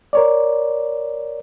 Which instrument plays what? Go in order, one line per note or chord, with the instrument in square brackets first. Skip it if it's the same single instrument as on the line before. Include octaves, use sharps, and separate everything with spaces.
[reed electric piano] A#4 C#5 D5